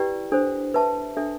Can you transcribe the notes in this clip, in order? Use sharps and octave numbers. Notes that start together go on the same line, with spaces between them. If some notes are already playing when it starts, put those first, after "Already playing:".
Already playing: E4 G4 B4 D5 G5
D4 A4 C5
B4 E5 A5
D4 A4 E5